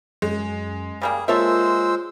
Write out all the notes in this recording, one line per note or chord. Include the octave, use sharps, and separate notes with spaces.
F#2 G#3
C#3 G3 A#3 G#4
G#3 A#3 F4 A4 C5 C#5 E5 E6